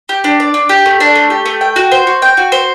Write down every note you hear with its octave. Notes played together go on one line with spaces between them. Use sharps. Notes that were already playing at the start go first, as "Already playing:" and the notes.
G4
D4
D5
D4
G4
A3
D4
A3
G4
A3
G5
F#4
C5
F#4
G5
F#4
C5